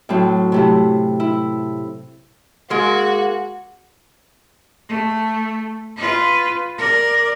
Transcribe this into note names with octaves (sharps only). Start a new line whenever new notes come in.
A2 F#3 C4
C3 A3 E4
E4
G#3 A#3 F#4
A3
F4 B4
A#4 D5